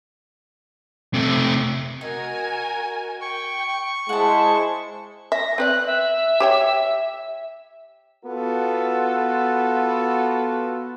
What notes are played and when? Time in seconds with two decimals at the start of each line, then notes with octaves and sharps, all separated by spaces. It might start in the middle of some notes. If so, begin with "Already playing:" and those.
1.14 C3 A3
2.01 D#4 F#4 A#4 G#5
3.21 G5 C#6
4.09 G#3 E4 C5 F#5 A5
5.32 E5 A#6
5.58 C4 B4 D5 F#6
5.86 E5
6.40 G4 C#5 G5
8.26 B3 F4 F#4 A4